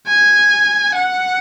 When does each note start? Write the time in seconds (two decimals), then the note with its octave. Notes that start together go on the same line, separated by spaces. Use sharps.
0.08 G#5
0.95 F#5